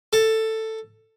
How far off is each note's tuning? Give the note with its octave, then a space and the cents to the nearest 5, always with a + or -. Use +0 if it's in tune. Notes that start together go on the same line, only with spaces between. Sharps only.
A4 +10